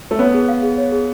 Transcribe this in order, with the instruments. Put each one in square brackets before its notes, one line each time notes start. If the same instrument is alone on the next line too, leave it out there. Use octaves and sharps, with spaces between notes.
[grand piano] A3
[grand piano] B3 [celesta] C#5
[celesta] G#4
F5
G#4
C#5
G#4